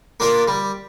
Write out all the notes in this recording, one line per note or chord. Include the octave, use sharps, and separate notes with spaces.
A#3 D4 F4 A#4
G3